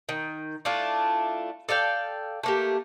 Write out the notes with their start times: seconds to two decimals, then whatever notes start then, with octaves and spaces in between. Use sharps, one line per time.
0.09 D#3
0.65 A3 D4 E4 F4
1.69 A4 D5 F5 G5
2.43 A3 A#3 G4